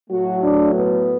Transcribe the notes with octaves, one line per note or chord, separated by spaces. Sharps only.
A2 F#3 A3 F#4
D4
B3